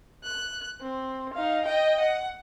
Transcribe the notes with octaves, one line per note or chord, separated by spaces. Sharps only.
F#6
C4
D#4 F5
D#5 G5
F#5